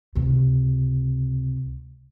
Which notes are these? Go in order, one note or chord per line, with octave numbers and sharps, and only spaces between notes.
C#2 C3